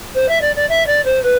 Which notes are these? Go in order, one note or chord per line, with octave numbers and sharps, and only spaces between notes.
C5
E5
D5
D5
E5
D5
C5
B4